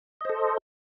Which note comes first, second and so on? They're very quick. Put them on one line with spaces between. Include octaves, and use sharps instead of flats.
D#5 C5 A4